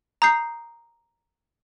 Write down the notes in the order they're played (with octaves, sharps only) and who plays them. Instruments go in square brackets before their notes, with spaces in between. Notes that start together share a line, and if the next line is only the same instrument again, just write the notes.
[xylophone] A#5 D#6 G6 C7